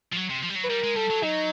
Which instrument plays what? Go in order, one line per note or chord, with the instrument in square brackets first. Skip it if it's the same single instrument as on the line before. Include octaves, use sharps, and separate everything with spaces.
[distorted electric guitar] F3
F#3
C3
F3
G3
F#3
[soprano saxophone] B4
[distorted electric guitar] G3 [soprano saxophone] A#4
[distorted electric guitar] G#3
[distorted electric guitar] G3 [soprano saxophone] A4
[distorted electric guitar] F#3
[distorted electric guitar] F#3 [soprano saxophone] D#4